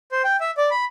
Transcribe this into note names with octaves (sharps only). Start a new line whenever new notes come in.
C5
G5
E5
D5
B5